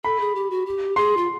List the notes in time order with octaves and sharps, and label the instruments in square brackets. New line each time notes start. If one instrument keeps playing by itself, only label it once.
[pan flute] A4 [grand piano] B5
[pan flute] G#4
G4
F#4
G4
[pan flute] G#4 [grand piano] C6
[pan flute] F4